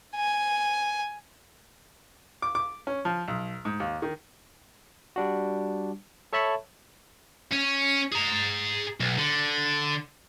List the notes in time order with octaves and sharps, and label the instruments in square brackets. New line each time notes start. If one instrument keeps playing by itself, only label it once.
[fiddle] G#5
[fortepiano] D6
D6
C#4
F3
B1
G#2
D#2
D#3
[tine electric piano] G3 D4 F#4
A4 C#5 E5 A5 B5 C#6
[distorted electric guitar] C#4
G#4 A#5
B1
D3